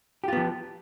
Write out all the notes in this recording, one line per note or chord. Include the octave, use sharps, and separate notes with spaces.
F3 B3 F4 G4